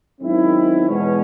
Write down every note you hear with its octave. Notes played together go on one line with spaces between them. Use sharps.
F#2 D#3 G#3 C4 E4
E2 B2 G#3 C#4